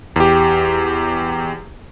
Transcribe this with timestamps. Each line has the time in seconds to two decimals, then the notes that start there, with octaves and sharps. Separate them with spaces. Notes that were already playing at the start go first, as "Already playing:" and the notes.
0.16 E2 G4